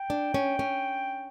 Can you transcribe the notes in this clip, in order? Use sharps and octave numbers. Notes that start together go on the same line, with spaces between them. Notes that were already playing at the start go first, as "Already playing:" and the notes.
Already playing: G5
D4
C#4
C#4